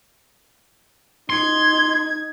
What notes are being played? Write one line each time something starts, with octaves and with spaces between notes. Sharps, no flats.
D#4 C6 G#6